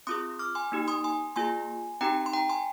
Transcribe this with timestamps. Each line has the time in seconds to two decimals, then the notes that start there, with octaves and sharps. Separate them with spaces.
0.07 C4 F4 G#4 C6 D#6
0.39 D6 F6
0.55 G#5 C6
0.72 A#3 D#4 G4
0.88 C6 D#6
1.04 G#5 C6
1.36 A#3 F4 G#4 G#5 C6
2.01 C4 D#4 G4 G5 A#5
2.26 C6
2.33 G5 A#5
2.49 G#5 C6